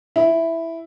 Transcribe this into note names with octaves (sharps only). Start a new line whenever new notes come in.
E4